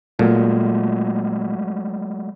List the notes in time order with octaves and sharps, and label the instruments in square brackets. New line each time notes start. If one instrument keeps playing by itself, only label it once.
[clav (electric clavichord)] A#2 [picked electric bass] F#3 G#3 A3